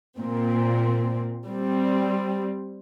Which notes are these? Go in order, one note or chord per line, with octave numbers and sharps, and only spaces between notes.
A#2 C4
G3 C4